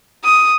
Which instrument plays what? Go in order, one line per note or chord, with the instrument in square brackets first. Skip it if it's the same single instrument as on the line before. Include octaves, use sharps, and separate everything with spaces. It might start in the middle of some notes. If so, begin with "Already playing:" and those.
[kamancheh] D#6